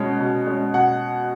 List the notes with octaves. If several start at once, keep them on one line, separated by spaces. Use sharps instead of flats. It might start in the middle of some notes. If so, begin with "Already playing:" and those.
Already playing: B2 G#3 C#4
B2
G#3 C#4
B2 F#5